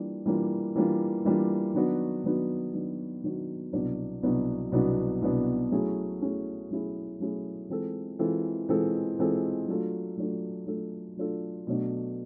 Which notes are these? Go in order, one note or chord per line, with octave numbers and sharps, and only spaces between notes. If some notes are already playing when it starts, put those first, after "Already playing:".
Already playing: E3 G3 A#3 D4 F4
E3 G3 A#3 D4 F4
E3 G3 A#3 D4 F4
E3 G3 A#3 D4 F4
D#3 F#3 B3 D4 F#4
D#3 F#3 B3 D4 F#4
D#3 F#3 B3 D4 F#4
D#3 F#3 B3 D4 F#4
C2 B2 F#3 B3 D4
C2 B2 F#3 B3 D4
C2 B2 F#3 B3 D4
C2 B2 F#3 B3 D4
F#3 A3 C#4 E4 G#4
F#3 A3 C#4 E4 G#4
F#3 A3 C#4 E4 G#4
F#3 A3 C#4 E4 G#4
E3 G#3 C4 F4 A4
E3 G#3 C4 F4 A4
E3 G#3 C4 F4 A4
E3 G#3 C4 F4 A4
F#3 A3 D4 F4 A4
F#3 A3 D4 F4 A4
F#3 A3 D4 F4 A4
F#3 A3 D4 F4 A4
B2 F#3 A3 D4